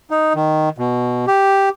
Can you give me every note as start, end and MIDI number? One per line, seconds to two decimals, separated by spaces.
0.11 0.33 63
0.35 0.69 51
0.78 1.25 47
1.27 1.69 67